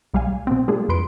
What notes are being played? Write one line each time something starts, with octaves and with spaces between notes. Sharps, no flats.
B1 G3 G#3 F5 G#5
B2 B3 C4
G3 G#3 A#3 D4 F4 G#4
F2 B2 B4 C6 D7